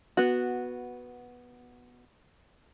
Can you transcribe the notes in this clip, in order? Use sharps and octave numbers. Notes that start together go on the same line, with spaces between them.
B3 F#4